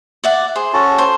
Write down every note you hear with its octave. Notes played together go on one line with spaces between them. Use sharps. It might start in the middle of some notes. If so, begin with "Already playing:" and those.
D5 E5 F#5
G#4 C5
C#4 F#4 A4
C5